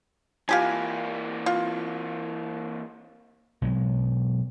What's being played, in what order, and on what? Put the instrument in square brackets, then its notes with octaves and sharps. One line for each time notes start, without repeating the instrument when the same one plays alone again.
[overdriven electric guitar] E3 A#3 [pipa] F4 G4 G#5
[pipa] F4
[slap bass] B2 F#3 G#3